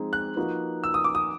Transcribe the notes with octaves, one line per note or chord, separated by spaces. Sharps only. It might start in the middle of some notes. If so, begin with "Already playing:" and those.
Already playing: F3 G#3 C4 D#4 G#4
F#6
F3 A#3 D#4 F#4 B4
E6
D#6
D6
D#6